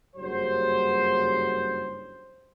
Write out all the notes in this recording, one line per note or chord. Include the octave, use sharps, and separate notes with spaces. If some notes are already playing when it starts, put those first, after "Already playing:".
F#1 G2 F#3 C5